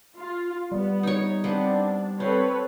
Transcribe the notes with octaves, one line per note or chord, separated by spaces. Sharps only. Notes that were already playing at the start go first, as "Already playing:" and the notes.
F4
G3 B3
D#4 C#5
B3 C4 D4
C4 A4 B4 C#5